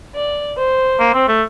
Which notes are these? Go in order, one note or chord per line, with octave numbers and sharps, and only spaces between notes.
D5
C5
A#3
C4
A3